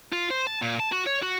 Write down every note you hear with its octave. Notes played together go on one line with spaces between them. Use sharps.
F4
C5
A5
A#2
A5
F#4
C#5
F#4